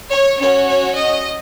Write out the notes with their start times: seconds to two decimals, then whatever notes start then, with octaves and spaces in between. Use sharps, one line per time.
0.10 C#5
0.40 C#4 F#4 C#5
0.69 C#5
0.99 D#5